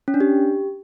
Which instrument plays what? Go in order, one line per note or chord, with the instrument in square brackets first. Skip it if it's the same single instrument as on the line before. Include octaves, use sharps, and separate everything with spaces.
[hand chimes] C#4
D4
G4